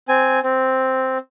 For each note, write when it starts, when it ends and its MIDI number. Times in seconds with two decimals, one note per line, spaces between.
0.08 0.40 60
0.08 0.40 80
0.43 1.18 60